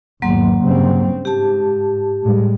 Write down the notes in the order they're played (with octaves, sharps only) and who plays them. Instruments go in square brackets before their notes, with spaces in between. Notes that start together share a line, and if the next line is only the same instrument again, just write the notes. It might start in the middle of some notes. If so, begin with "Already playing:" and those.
[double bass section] G#1 E2 [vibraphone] F#3 A#3 C6
[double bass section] G2 C#3 C4
[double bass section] G#2 [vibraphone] G4 A5
[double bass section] A2 G3 G#3